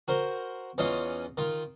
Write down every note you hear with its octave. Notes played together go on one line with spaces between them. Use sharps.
F#4 A#4 C5
E2 C#4 F4 D#5 F5
D#3 F4